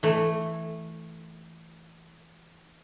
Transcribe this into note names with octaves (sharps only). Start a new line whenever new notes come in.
E3 A3